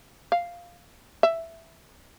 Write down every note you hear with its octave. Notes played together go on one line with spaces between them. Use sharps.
F5
E5